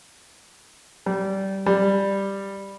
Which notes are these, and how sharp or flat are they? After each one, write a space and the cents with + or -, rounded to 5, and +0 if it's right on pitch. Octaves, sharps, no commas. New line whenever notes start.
G3 -20
G3 +5